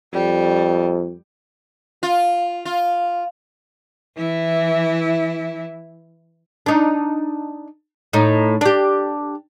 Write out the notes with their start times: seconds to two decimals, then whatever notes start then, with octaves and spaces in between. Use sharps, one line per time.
0.13 F2 G3
2.03 F4
2.65 F4
4.17 E3 E4
6.66 D4 D#4
8.13 A2 D#4
8.61 D4 G4